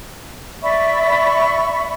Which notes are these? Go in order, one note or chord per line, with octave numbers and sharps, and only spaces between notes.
D5 E5 B5 C#6